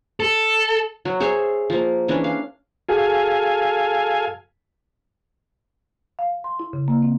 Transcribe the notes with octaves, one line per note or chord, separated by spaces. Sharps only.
A4
F#3
G#4 C5 C#5 E5
F3 A#3
E3 C#4 D4
F5
F#4 G#4 A4 F5 G#5
F5
C6
E4
C#3
A#3
C4